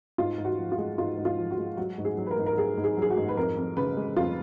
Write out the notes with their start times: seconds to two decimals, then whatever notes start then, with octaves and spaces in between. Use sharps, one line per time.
0.18 G#2 F4
0.38 G#2
0.45 F#4
0.59 F3
0.72 F4
0.78 G#3
0.98 G#2 F4
1.18 G#2
1.25 F4
1.38 F3
1.51 F#4
1.58 G#3
1.77 F#3 F#4
1.98 G#2
2.05 G#4
2.17 F#3
2.27 B4
2.31 A#4
2.37 G#2
2.46 A#4
2.57 F#3 G#4
2.77 G#2
2.84 G#4
2.97 F#3 G#4
3.10 F#4
3.17 G#2
3.28 B4
3.37 F2 A#4
3.57 F2
3.77 C#3 B4
3.97 G#3
4.16 F2 F4